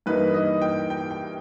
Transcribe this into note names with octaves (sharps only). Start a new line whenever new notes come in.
G2 E3 A#3 D#4 B4
D#5
G5
G5
G5